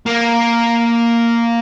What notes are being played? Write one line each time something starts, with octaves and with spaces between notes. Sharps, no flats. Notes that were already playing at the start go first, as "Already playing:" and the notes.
A#3